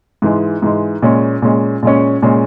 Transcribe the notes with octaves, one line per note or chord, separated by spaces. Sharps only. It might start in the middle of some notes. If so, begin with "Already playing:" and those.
G#2 E3 G#3
G#2 E3 G#3
A#2 G#3 C#4
A#2 G#3 C#4
A#2 G#3 C#4
A#2 G#3 C#4